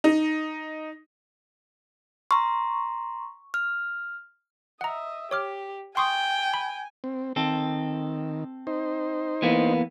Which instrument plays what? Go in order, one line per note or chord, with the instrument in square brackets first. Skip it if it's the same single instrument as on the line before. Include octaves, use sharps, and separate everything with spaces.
[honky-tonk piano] D#4
[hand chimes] A#5 C6 [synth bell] C#6
[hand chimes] F6
[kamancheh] D#5 E5 [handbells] F#5 A#5
[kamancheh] G4 [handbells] C#5 D6 F6
[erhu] G5 [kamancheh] G#5 [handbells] C6 C#6 D#6
[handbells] B5
[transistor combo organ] C4
[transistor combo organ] D#3 [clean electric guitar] C4 A4
[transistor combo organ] D#4 C5
[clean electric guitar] E3 A#3 B3